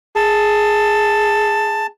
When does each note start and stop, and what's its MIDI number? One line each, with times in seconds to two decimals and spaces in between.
0.16 1.86 68
0.16 1.87 81